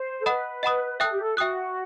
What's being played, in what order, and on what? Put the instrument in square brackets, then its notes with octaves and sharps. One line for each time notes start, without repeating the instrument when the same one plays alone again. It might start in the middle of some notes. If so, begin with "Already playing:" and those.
Already playing: [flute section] C5
A4
[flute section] B4 [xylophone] D#5 F#5 B5 D#6
[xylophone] D#5 F#5 B5 D#6
[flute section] A4 [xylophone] E5 G5 D#6 F#6
[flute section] G4
A4
[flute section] F#4 [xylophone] E5 G5 D#6 F#6